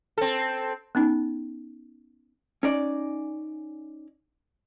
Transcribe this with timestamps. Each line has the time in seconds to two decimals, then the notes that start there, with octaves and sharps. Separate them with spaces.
0.18 C4 A4
0.95 B3 C#4 D#4
2.63 C#4 D#4 D5